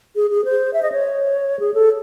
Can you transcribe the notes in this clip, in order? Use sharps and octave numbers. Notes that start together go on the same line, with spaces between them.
G#4
G#4
C5
E5
D#5
C#5
G#4
A4